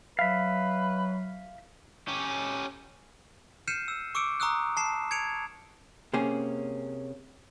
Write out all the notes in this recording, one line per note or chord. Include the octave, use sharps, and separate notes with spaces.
F#3 B4 E5 F5
C#4 G4
F6 G6 C7 C#7 D#7 E7
E6
C#6 D6 E6 C#7 D7
A#5 C#6 D#6 E6 F#6
A5 C7 E7
G#6 C#7 D7 F7
C3 A#3 C#4 G#4